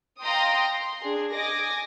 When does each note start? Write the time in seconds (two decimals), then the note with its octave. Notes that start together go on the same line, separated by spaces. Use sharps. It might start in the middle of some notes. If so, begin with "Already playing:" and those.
0.21 D#5 F5 G5 A#5 C6 D#6
0.72 C6
1.01 D4 G#4
1.33 D#5 G#5 D6 D#6 A#6